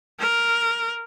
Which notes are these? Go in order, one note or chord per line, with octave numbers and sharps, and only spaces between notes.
A#4